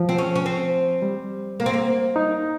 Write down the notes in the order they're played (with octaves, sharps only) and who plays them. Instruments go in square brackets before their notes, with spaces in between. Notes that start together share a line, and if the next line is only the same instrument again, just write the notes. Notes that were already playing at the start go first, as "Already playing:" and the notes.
Already playing: [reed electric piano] F3
[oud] C4
C#4
C#4
C4
[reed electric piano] G3
[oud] A#3
C4
A#3
[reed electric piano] D#4